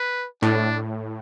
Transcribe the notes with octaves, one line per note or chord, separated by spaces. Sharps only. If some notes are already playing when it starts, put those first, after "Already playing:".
Already playing: B4
A2 D4